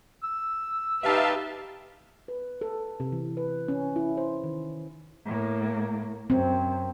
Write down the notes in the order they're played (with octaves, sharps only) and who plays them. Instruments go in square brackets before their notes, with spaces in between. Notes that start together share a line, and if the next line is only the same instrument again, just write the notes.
[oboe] E6
[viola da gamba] D#4 G4 B4 [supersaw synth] E5 F5 A5
[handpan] B4
A4
C3
E3
B4
C#4
E4
C5
D#3
[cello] A2 A#3
[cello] F#2 [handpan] C4